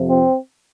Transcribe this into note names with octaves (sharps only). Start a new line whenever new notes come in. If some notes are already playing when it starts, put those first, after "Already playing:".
Already playing: F2 C3 F3
C4